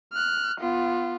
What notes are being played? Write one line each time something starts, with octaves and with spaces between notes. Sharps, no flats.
F6 F#6
B3 F4